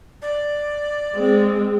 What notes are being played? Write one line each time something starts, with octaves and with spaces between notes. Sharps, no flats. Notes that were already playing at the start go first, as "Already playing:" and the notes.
D5
G#3 C4